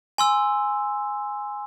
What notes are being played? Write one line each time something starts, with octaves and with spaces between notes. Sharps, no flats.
G#5 C6 E6